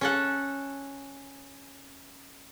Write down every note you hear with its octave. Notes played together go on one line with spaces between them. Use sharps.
C#4 A4 F#5